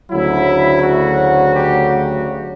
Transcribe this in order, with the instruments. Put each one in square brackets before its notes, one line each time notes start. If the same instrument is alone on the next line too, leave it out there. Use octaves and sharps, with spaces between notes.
[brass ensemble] D2 C#3 F#3 E4
F#4
G4
F#4